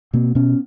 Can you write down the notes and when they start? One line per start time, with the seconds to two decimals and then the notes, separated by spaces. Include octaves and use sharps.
0.13 B2 A#3 C4
0.35 B2 B3 C#4